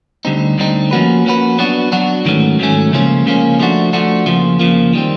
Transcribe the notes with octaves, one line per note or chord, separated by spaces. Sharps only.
D2 D3 G3 C4 D#4
D2 D3 G3 C4 D#4
F3 A#3 C#4 F#4 B4
F3 A#3 C#4 F#4 B4
F#3 B3 D4 F#4
F#3 B3 D4 F#4
G#2 D#3 F#3 A3 C#4
G#2 D#3 F#3 A3 C#4
C#2 C#3 F3 A#3 C#4
C#2 C#3 F3 A#3 C#4
F3 A3 D4 F#4
F3 A3 D4 F#4
F2 C#3 F3 A#3
F2 C#3 F3 A#3
D#3 G3 C4